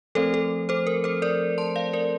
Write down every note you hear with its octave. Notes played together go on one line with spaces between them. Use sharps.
F3 A3 C4 A4 C5
A4
A4 C5
A#4
A4 C5
A#4 D5
A5 C6
D5 F5
A#4 D5